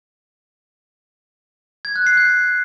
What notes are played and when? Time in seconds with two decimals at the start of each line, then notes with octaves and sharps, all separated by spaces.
1.85 G#6
1.96 F#6
2.06 C7
2.17 G6